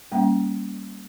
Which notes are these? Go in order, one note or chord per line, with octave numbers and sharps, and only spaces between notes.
G3 A#3 C#4 G5